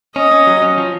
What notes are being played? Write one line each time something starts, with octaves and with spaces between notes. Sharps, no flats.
C#4 D#5
C#4
F#3
C#4
F3